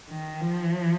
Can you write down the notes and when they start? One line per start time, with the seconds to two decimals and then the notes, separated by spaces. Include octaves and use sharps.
0.10 D#3
0.41 F3